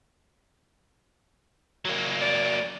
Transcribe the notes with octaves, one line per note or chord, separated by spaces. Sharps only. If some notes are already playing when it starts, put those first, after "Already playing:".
F#3 A#3
D5